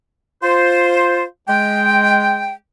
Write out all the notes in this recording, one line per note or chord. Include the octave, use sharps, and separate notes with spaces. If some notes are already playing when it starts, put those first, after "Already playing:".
F4 C5
G#3 G5